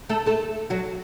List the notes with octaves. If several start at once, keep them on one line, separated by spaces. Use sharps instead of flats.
A3 A4
A3 A4
F#3 F#4